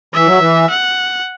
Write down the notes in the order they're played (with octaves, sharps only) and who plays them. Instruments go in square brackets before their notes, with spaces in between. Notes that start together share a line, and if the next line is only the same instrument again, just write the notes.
[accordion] E3 [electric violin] E5
[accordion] F#3
E3
[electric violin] F#5